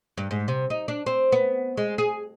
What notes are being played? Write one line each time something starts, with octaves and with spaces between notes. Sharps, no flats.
G2
G#2
C3
D#4
D4
C4
B3
G#3
G#4